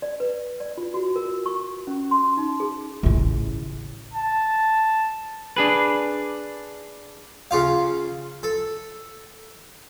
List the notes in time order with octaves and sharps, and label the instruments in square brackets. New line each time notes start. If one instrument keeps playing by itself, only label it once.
[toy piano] D5
B4
D5
F4
F#4
A#4
C#6
C#4
C6
D#4
G#4
[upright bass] A1 C#3
[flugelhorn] A5
[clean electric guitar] D4 G#4 B4
[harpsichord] C#3 F4 F5
A4